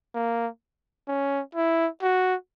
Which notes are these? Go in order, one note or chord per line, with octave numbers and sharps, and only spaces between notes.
A#3
C#4
E4
F#4